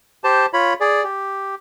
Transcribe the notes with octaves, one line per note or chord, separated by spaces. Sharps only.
G4 C5 A5
F4 C#5 B5
G#4 D5
G4